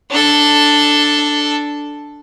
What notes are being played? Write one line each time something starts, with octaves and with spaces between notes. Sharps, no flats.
D4 A4